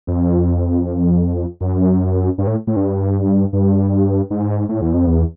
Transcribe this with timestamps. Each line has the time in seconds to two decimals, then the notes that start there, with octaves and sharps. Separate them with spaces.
0.07 F2
1.60 F#2
2.38 G2
2.47 A2
2.67 A2
2.76 G2
3.53 G2
4.30 G#2
4.69 A2
4.82 E2
4.94 F2
5.07 E2